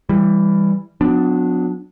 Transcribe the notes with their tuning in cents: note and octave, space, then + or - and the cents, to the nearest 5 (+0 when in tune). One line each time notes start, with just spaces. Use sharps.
E3 +5 G3 +20
F#3 -35 B3 +30 D4 +5